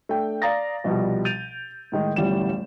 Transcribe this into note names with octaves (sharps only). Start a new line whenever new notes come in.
A3 D4 G5
D5 F5 A#5 D#6 A6 A#6
C2 B2 F3 G3
G6 A6 D7 D#7 F7
A2 D#3 G#3
D1 G1 E3 G3 C#4 E7